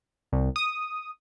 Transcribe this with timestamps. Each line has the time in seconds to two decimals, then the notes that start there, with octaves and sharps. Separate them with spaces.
0.32 C2
0.56 D#6